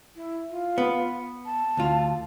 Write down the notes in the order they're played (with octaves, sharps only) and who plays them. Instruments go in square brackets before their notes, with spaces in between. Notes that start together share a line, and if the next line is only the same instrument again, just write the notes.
[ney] E4
F4
[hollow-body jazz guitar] B3
[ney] A5
[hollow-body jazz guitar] D2 F4